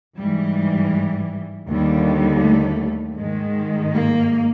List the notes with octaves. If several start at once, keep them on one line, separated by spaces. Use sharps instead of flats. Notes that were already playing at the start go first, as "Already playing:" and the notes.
G#2 E3 G3
D#2 D3 G3
A3
G#2 D#3 G#3
A#3